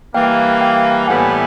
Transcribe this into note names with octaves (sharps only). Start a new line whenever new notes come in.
E3 G3 A#3 F5 G5
F5 G5
A2 E3 G3 B3 E4 F#5 G#5